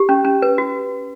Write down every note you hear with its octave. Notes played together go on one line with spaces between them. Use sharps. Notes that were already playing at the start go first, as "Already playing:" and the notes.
Already playing: G4
C#4
C#4
B4
F#4